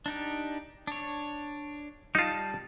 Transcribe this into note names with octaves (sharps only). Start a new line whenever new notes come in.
D4 D#4 G4
D4 C#5
G3 D#4 F4 A5